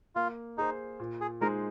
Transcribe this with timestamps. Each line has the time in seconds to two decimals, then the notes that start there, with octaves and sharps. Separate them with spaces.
0.15 A#3 F4
0.58 D#4 G#4 C5
1.00 A#2
1.21 G#4
1.41 G#3 D#4 G#4 A#4 C5